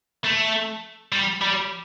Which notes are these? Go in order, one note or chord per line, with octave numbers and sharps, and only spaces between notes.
A3
G3
G3